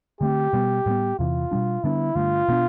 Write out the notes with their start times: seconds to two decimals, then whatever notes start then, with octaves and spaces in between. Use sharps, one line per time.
0.21 D3 A3 C4 G4
0.53 B2 G3 B3
0.86 A2 G3 B3
1.19 E2 C3 E3 F4
1.51 B2 G3 D4
1.84 D3 G3 B3 D4 E4
2.15 G2 D3 A3 F4
2.48 B2 B3 D4